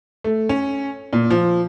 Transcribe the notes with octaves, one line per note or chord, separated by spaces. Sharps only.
A3
C#4
A#2
F3